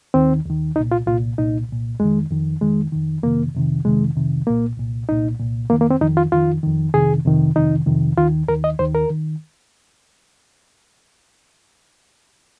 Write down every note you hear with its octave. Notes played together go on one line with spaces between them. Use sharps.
D#2 D#3 C4
D#2 D#3
C2 A#2 D#4
F4
C2 A#2 F4
C2 A#2 D#4
C2 A#2
F2 D#3 G#3
F2 D#3
F2 D#3 G#3
F2 D#3
F2 C3 D#3 A#3
F2 C3 D#3
F2 C3 D#3 G#3
F2 C3 D#3
C2 A#2 A#3
C2 A#2
C2 A#2 D#4
C2 A#2
F2 D#3 A#3
A#3
C4
F2 D#3 D#4
F4
F2 D#3 F4
F2 D#3
F2 C3 D#3 G#4
F2 C3 D#3
F2 C3 D#3 D#4
F2 C3 D#3
D#2 D#3 F4
D#2 D#3 A#4
D#5
D#2 D#3 C5
A#4
D#3